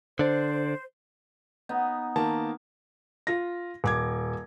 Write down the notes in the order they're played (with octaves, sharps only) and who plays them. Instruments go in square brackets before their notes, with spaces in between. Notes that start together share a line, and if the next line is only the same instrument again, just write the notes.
[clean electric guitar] D3 D4 [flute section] C5
[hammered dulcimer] B3 D#4
[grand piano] D#3 A#3 A5
[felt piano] F4 A#6
D#1 D6 G#6